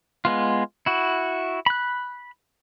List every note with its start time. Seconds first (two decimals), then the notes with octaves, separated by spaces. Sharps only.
0.25 G#3 B3 F4
0.86 E4 F#4
1.66 B5 F#6